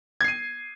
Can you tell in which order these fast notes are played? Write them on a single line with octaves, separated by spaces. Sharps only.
G#6 C7 D#7